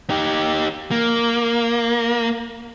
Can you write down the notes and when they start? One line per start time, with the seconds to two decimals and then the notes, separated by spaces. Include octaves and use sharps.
0.10 D#4 G4
0.91 A#3